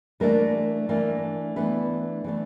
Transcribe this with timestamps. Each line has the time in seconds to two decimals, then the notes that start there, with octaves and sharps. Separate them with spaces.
0.20 E3 A3 A#3 D4 A#4
0.89 E3 A3 A#3 D4 A#4
1.56 E3 A3 B3 D4 B4
2.24 E3 A3 D4